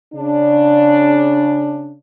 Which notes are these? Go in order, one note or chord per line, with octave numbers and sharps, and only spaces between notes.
C#3 D4